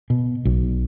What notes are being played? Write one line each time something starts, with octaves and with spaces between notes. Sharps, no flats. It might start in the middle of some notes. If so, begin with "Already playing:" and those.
B2
B1